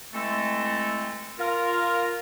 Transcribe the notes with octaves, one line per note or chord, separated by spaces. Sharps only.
E3 G#3 A3 C4 A4
F4 A#4